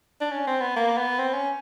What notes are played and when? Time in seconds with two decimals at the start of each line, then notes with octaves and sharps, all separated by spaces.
0.20 D4
0.32 C#4
0.47 C4
0.61 B3
0.76 A#3
0.98 B3
1.19 C4
1.33 C#4